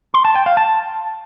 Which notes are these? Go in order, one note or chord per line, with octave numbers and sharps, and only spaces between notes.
C6
A5
G5
F5
A5